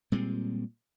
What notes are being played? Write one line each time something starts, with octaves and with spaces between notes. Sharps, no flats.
A#2 G3 G#3 C4